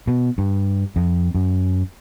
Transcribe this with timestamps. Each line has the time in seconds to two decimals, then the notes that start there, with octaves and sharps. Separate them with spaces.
0.07 B2
0.38 G2
0.96 F2
1.35 F#2